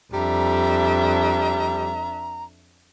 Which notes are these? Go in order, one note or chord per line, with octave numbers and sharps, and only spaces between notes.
F2 G3 D4 E5 A#5